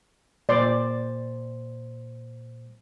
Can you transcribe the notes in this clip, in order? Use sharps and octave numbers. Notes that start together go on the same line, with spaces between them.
A#2 C5 D5 C6